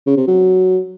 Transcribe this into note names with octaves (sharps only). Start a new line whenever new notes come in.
C#3
C3
F#3